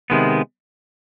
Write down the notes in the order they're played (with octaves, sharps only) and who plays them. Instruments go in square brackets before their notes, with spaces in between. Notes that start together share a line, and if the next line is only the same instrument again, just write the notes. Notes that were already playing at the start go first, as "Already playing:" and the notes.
[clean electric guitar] C3 D#3 G#3 B3